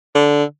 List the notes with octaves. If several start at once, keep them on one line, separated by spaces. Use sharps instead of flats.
D3